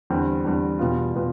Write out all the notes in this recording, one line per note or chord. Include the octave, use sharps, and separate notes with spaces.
E2 D3 G3 C4
E2 D3 G3 C4
E2 B2 G3 B3 F4
B2 G3 B3 F4